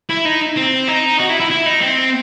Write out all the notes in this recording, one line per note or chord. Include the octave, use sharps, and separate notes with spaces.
E4
D#4
C4
D#4
F#4
E4
E4
E4
D#4
C4